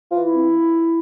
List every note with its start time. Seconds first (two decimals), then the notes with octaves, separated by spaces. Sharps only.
0.11 E3 F4
0.23 E4
0.32 C4